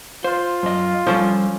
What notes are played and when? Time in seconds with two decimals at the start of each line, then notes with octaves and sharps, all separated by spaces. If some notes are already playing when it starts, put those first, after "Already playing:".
0.24 F4 C5
0.63 F#2 D#5
1.07 F3 G3 C#4 A4 C5